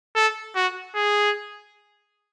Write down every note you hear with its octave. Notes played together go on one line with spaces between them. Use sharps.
A4
F#4
G#4